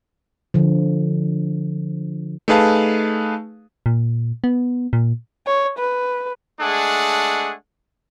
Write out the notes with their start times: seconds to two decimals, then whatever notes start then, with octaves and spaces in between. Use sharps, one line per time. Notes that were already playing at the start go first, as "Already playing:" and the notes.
0.54 D3 F3
2.48 A3 D#4 G#4 B4 F5 A5
3.86 A#2
4.44 B3
4.93 A#2
5.47 C#5
5.79 B4
6.60 G#3 A3 D4 G#4 F#5